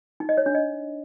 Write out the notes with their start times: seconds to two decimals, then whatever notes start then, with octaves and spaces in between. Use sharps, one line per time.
0.20 D#4
0.29 D#5
0.37 C#5
0.46 D4
0.55 D#5